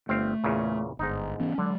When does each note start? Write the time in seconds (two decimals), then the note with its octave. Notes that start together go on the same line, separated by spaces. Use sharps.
0.09 G1 A3 C4 F5
0.44 E2 A#2 C#3
0.99 G1 G#2 D#4
1.40 E3 B3 C#4
1.58 D3 F#3 G#3